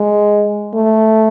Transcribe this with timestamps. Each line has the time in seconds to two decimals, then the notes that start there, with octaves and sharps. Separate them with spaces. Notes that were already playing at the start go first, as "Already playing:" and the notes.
Already playing: G#3
0.74 A3